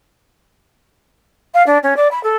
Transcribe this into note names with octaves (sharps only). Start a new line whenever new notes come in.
F5
D4
C#4
D5
B5
A4